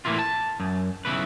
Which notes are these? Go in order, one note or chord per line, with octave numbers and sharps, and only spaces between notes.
A2 E3 A#3 E4 F4
A5
F#2
B1 G2 C#3 E4 B4